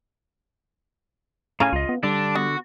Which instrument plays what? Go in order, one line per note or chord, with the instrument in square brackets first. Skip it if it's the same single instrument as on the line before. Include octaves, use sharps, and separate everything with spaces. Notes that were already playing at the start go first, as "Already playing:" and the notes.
[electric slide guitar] A2 C#4 G#5 [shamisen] C#3 F5 A#5
[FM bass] C#2 [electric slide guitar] F4 D#5
[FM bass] B3
[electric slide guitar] D3 [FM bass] G3 [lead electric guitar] D4
[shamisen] B3 [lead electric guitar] F#4